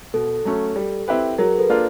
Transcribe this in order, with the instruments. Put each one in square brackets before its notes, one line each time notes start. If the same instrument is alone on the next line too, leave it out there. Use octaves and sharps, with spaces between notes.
[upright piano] B2 [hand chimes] A4
[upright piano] F#3 A3 C#4
G3
C4 E4 G4 B4
[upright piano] F#3 [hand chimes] G#4 A#4
[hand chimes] A4 B4
[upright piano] A#3 D4 F4